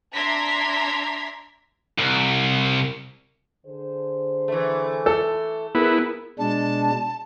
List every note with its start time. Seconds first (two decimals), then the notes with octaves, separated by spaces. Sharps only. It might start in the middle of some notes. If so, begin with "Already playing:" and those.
0.14 D4 E5 A#5 C6 G#6 B6
1.98 C2
3.66 D3 G#4 C5
4.48 E3 A3
5.06 A4
5.75 B3 E4 G#4 A#4
6.39 B2 G#3 D4 A5